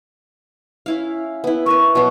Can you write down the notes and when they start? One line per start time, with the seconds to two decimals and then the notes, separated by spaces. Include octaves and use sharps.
0.86 C#4 E4 F5
1.44 B3 E4
1.66 A#4 B4 C#6
1.95 B2 F#3